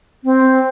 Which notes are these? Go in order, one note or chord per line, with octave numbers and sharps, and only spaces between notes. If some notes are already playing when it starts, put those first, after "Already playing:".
C4